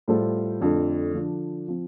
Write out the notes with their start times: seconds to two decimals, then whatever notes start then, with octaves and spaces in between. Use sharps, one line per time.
0.08 A2 G3 F4 A4 C5
0.60 F2 D3 A3 D4
1.14 D3 F3 D4
1.68 F3 C4